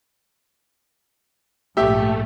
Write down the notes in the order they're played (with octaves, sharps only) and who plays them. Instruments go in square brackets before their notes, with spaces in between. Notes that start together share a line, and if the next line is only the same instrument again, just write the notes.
[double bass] A#1 G#2 [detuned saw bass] A3 [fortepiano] G4 E5